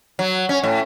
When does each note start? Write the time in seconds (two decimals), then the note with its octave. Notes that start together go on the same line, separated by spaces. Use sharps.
0.19 F#3
0.49 C#4
0.63 A2